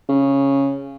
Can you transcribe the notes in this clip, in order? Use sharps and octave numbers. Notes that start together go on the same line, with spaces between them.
C#3